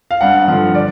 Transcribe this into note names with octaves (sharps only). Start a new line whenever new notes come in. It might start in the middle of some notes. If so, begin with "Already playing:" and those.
F5
G2 F#5
D3 F3
D5